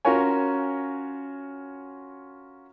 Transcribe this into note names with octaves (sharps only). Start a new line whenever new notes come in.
C#4 F4 F#4 A#4 C#5 G#5